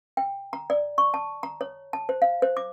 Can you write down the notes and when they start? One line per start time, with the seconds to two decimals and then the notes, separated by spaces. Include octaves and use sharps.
0.17 G5
0.53 A#5
0.70 D5
0.98 C#6
1.14 A5
1.43 A#5
1.61 C#5
1.93 A5
2.09 C5
2.22 F5
2.42 C5
2.57 D6